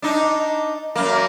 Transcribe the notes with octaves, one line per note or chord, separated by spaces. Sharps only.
D4 D#4
F#2 A#3